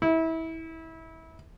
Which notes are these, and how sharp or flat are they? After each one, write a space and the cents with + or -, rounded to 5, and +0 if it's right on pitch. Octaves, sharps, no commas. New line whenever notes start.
E4 -25